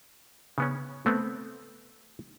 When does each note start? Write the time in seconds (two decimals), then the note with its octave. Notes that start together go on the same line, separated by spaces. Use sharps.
0.58 C#3 B3 C#4
1.06 A3 B3 C4